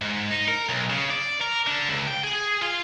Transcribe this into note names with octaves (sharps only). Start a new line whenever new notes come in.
G#2
D#4
A#4
B1
C#3
D5
A#4
D3
C#2
G5
G#4
F4